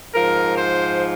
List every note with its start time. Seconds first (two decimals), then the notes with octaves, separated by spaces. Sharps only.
0.13 G#2 F3 A#4
0.57 C5